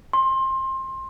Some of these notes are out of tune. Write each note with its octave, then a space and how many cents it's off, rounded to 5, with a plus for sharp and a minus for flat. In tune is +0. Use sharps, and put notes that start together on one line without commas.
C6 +20